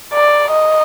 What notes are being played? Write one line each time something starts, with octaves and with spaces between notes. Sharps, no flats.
D5
D#5